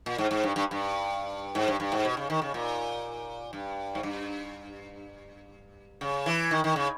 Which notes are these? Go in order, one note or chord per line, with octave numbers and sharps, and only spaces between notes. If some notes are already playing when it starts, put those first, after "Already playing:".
A#2
G#2
G#2
G2
G2
G2
G#2
G2
G2
G#2
B2
C#3
D#3
C#3
A#2
G2
G#2
G2
C#3
E3
D#3
D#3
C#3